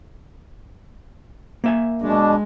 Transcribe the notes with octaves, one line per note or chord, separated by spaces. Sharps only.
A#3 E5 G#5
B2 G#3 D4